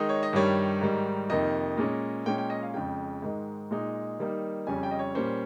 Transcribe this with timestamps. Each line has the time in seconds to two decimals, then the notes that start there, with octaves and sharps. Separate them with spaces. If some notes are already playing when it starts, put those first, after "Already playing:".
Already playing: D#3 G#3 D#4
0.09 C#5
0.23 D#5
0.33 G2 D#3 G3 C#5
0.81 G#2 D#3 G3
1.30 F2 C3 D#3 A#3 D#4 D#5
1.78 A#2 G#3 C#4
2.26 A#2 G#3 C#4 G5
2.38 G5
2.50 D#5
2.63 F5
2.74 F2 C#3 G#3 G5
3.22 G#2 D#3 G#3
3.71 A#2 G#3 D#4
4.19 D#3 G3 A#3 D#4
4.67 F2 C#3 G3 C#4 G#5
4.83 G5
4.91 D#5
4.99 C#5
5.15 A#2 G3 A#3 C#4 C5